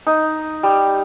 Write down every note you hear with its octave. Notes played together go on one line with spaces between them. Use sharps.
D#4
G3